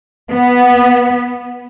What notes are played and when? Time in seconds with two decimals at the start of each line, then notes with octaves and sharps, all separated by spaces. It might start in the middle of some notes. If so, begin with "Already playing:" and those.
0.33 B3